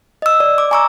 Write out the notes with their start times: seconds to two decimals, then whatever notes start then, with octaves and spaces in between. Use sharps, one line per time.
0.22 D#5 E6
0.40 D5
0.58 D6
0.71 G#5 A#5 C#6 D6 E6